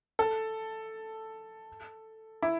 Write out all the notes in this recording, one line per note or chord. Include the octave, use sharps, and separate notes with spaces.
A4
E4